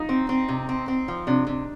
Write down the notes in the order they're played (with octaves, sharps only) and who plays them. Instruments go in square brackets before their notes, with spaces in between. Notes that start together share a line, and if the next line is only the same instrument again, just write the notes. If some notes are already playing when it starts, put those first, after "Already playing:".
Already playing: [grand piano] D#4 F4
[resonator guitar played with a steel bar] C4
C4
C3
C4
C4
F3
[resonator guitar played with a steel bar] C3 [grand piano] D4
[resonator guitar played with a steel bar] C3